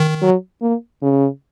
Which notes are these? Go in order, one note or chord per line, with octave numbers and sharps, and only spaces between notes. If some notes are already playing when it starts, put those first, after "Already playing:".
Already playing: D#3
F#3
A#3
C#3